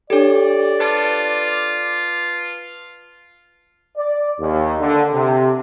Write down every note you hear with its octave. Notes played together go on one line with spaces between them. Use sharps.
D4 G4 A4 C#5 D5
F4 B4 A5 D6
D5
D#2
D3
C3